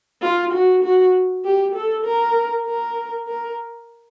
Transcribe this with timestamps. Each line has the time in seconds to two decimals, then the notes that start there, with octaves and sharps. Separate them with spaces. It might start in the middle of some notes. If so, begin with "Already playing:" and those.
0.22 F4
0.53 F#4
0.83 F#4
1.44 G4
1.75 A4
2.05 A#4
2.66 A#4
3.27 A#4